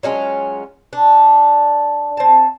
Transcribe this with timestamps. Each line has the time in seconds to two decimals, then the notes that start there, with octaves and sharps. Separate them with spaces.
0.03 F#3 G#3 C#4 F4
0.93 D4
2.17 C4 A5